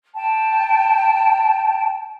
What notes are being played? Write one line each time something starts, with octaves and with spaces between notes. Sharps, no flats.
G5 A5